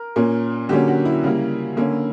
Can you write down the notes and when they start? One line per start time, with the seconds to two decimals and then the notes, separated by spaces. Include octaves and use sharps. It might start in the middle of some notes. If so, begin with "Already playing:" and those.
Already playing: A#4
0.16 A#2 A#3 C#4
0.69 D3 F#3 A#3 C#4 G4
0.88 F#4
1.05 E4
1.24 C#3 G3 A#3
1.77 D3 A#3 C#4